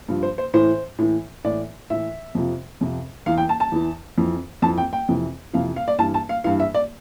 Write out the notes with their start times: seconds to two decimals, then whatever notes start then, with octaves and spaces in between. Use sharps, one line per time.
0.08 G2 F3
0.23 C5
0.38 C5
0.54 A2 E3 C5
0.98 A2 E3
1.45 A2 E3 D5
1.90 A2 E3 E5
2.35 F2 C3 F3
2.81 F2 C3 F3
3.26 E2 E3 F5
3.38 G5
3.49 A5
3.60 A5
3.72 E2 E3
4.18 F2 E3
4.62 F2 A5
4.66 E3
4.78 G5
4.93 G5
5.08 F2 C3 E3
5.53 F2 C3 E3 F5
5.76 F5
5.88 D5
5.99 G2 E3 A5
6.14 A5
6.29 F5
6.44 G2 E3 F5
6.60 E5
6.74 D5